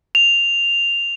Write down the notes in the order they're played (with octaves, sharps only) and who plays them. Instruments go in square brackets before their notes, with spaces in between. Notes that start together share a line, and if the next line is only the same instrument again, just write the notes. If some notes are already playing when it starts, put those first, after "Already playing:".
[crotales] F7